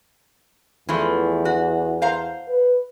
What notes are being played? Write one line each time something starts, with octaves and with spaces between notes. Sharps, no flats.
E2 E3 F3 A3
F#4
C5 F5 A#5
B4